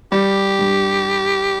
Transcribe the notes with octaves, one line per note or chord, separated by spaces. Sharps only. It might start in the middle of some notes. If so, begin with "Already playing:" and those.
G3 G4
G2